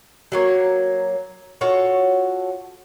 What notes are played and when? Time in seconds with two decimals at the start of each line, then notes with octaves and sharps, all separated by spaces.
0.32 F#3 A#3 C#5
1.61 F4 F#4 A4 C#5